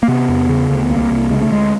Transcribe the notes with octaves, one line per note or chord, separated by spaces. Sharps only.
A#3
C3 B3
E2
C#3
D2
C2 A#3
C2
C#3 G#3
A3
D2 G#3